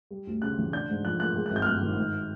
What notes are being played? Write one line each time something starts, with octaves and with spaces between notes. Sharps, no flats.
G3
D2
C#3 F#6
E3
D4 G6
G#2
F3 F#6
A#3 F#6
G#3
G#1 F#6
G6
F6
G2 F#6
D#3
G#2